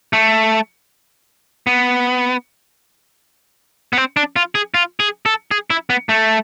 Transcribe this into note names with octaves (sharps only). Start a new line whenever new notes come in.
A3
B3
B3
C4
D4
F4
G#4
F4
G#4
A4
G#4
E4
B3
A3